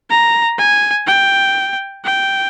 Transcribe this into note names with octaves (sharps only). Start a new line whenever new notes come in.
A#5
G#5
G5
G5